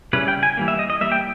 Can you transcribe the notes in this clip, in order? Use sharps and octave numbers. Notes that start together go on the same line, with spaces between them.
C#3 G3 C#4 E4 B4
G5
G#5
E3 G3 A#3
E5
D#5
D#5
E3 G3 A#3 E5
G5